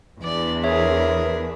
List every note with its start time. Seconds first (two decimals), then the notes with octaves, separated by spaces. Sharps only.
0.23 E2 D4 B4 D5
0.64 G#4 A#4 C#5 E5